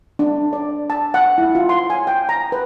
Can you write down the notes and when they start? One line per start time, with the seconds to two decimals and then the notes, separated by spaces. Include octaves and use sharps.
0.19 D4
0.53 D5
0.90 A5
1.14 F#5
1.38 E4
1.55 F4
1.69 C6
1.90 G#5
2.07 G5
2.29 A#5
2.52 B4